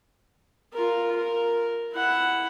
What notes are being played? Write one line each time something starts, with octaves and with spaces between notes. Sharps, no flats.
F4 A#4
A#4
E4 F#5